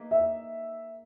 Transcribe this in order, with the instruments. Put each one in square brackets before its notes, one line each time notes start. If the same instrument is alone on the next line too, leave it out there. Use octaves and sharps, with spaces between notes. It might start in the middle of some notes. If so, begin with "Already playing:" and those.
Already playing: [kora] A#3 D#4 G#4 B4
[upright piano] E5